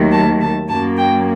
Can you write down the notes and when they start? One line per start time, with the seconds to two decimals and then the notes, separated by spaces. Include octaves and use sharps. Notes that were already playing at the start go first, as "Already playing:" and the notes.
Already playing: D#2 D#3 F#3 A3
0.11 A5
0.40 A5
0.68 F#2 F#3 A#3 A5
0.97 G5